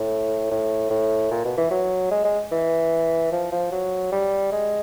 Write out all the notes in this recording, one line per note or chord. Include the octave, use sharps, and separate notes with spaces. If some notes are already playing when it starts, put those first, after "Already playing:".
Already playing: A2
A2
A2
A#2
B2
E3
F#3
G#3
G#3
E3
F3
F3
F#3
G3
G#3